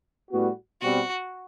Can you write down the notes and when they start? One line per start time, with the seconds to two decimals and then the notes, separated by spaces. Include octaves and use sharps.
0.30 A2 G3 B3 F#4
0.81 B2 G3 C4 F#4